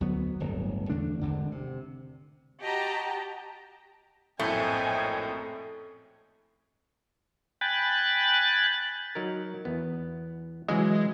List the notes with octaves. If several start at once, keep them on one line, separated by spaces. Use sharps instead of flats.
D2 F#3 B3
D1 G1
E2 D3 A3 D4
G#1 D3 D4
C3
F#4 G4 D#5 G5 A5 A#5
A#1 F#2 A2 A3 C4 D#5 G5 G#5
G5 G#5 B5 F#6 A6
F#3 D#4 A#4
E2 B3
C#3 E3 F#3 G#3